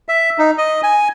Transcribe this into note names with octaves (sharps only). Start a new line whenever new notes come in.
E5
D#4
D#5
G#5